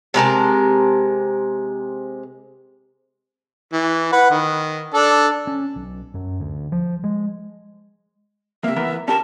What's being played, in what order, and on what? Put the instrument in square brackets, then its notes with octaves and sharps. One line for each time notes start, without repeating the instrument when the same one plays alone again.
[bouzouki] C3 G#3 A#4 A5
[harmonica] E3
B4 F#5
D#3
D4 A4
[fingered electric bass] C#4
B1
F#2
D2
F3
G#3
[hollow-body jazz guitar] C3 A#3 [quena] E5
[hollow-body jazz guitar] E3 B3 A#4
[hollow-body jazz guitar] C#4 G4 A#4 [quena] A5